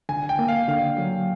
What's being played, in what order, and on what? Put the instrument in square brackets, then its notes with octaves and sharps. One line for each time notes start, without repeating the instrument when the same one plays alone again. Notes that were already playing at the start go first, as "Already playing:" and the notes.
[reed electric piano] D3 [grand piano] G#5
[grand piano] G5
[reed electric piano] A#3
[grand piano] F5
[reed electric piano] D3 [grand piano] F5
[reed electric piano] F#3